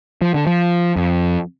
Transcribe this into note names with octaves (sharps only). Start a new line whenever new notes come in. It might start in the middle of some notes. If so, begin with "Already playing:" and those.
F3
D3
F3
F2